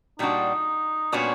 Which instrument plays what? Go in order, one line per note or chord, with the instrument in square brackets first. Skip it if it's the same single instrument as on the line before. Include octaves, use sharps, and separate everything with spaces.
[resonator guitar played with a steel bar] A#2 G3 B3 D4 F#4 [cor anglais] D#4
[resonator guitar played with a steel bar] A#2 G3 B3 D4 F#4 [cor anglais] C#4